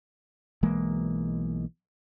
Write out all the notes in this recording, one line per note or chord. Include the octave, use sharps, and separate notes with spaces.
B1 E3 G#3 A#3